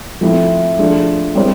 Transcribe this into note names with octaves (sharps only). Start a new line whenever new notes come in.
F3 A3 C4 E4
F3 A3 D4 F4 G#4
G3 C4 E4 G#4 C5